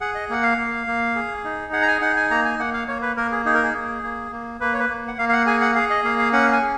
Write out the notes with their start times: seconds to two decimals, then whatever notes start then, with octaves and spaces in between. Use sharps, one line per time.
0.01 G#4 F#5
0.15 D#5
0.30 A#3 F#5
0.43 F5
0.58 A#3
0.87 A#3
1.16 G#4
1.44 D#4
1.73 G#4 F#5
1.82 A#5
1.88 G#5
2.02 D#4 F#5
2.16 G#5
2.31 A#3 A#5
2.45 G#5
2.59 A#3 F#5
2.74 F5
2.88 A#3 C#5
3.02 B4
3.17 A#3 A#4
3.31 G#4
3.45 D#4 G#4
3.54 A#4
3.63 G#4
3.74 A#3
4.03 A#3
4.32 A#3
4.60 A#3 B4
4.73 C#5
4.80 B4
4.89 A#3
5.08 F#5
5.18 A#3 F5
5.29 F5
5.33 F#5
5.46 G#4 G#5
5.61 F#5
5.75 G#4 F5
5.90 D#5
6.04 A#3 F5
6.19 F5
6.33 C#4 F#5
6.53 G#5
6.62 G#4